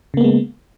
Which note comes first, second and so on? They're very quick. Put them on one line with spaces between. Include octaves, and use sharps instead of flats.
C#3 A#3 B3 G#3